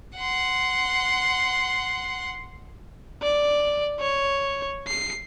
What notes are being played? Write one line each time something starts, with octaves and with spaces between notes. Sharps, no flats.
F#5 C6
D5
C#5
C7